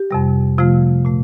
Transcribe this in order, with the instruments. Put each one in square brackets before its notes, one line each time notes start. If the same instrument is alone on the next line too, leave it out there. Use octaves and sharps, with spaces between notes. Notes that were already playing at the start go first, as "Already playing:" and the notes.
Already playing: [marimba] G4
F2 C3 G3
C3 F3 A3 F4
A#2 A3